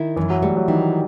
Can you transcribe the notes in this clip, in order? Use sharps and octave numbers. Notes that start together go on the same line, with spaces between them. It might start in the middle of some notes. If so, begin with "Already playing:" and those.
Already playing: D#3 E4
F#2 E3
F#3
G3 A3
F#3
D#3 E3